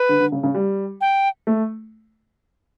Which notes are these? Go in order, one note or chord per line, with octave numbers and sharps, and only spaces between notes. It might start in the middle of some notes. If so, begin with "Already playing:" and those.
Already playing: B4
D3
D3
C#3
C#3
G3
G5
A3